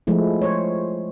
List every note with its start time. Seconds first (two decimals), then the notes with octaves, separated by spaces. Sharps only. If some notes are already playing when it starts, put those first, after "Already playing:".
0.07 F3 G#3 A3 E4
0.42 C5 C#5